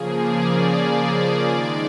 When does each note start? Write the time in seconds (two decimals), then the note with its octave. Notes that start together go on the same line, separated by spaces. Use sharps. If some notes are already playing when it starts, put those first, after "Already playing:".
Already playing: C#3 F3 A#3 G#4
0.18 D5
1.46 D#3 G#3